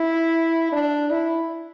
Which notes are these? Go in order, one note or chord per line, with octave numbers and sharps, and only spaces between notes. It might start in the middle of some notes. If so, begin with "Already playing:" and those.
Already playing: E4
D4
E4